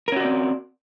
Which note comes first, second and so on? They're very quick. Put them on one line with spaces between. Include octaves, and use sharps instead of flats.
A#4 C#4 F#4 D5 C4